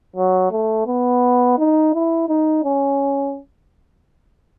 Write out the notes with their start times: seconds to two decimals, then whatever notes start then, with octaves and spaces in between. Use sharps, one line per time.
0.16 F#3
0.51 A3
0.87 B3
1.59 D#4
1.94 E4
2.29 D#4
2.64 C#4